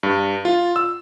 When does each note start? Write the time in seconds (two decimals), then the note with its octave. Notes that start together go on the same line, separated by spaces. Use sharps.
0.03 G2
0.45 F4
0.76 E6